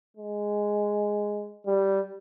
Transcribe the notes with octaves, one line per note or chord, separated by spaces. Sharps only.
G#3
G3